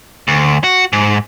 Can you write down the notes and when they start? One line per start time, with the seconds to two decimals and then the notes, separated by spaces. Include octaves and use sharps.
0.28 D2
0.64 F#4
0.93 G#2